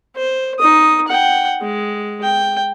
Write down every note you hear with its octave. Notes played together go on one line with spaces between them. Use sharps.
C5
D#4 D#6
F#5 G5
G#3
G5